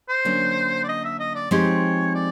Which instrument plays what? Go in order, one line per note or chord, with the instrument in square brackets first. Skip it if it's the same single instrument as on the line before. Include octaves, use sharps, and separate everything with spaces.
[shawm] C5
[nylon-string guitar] D3 F#3 A#3 C#4
[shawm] D5
D#5
E5
D#5
D5
[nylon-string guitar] F3 G#3 C4 D#4 G4 [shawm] C#5
[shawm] D5